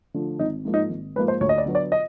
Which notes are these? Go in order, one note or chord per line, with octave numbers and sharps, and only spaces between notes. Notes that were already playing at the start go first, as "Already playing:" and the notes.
D3 F3 A3
G#1 D#4
G#2 F3 A#3
D#4
G#1
G#2 F3 A#3 B4
C5
D2 C#5
D#5
D5
D3 F#3 B3
D5
D#5